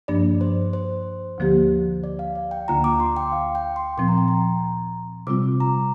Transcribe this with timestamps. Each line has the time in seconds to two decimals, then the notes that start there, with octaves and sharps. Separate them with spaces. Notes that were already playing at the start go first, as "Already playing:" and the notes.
0.08 G2 F3 A#3 D4 D5
0.41 C5
0.73 C5
1.38 D2 D3 F3 A#3 G4
2.04 D5
2.19 F5
2.35 D5
2.51 G5
2.68 D2 D3 A#3 F4 A#5
2.84 D6
3.00 C6
3.16 G5
3.32 F5
3.55 G5
3.76 C6
3.98 A#2 F3 C4 C6
4.08 A#5
4.18 G5
4.28 A#5
5.27 C3 G3 C4 F4 D6
5.60 A#5